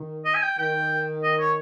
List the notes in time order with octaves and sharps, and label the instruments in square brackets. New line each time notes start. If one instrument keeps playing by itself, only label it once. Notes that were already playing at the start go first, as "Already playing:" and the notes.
Already playing: [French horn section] D#3
[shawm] D#5
G#5
G5
[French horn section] D#3 [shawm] G5
[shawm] D#5
C#5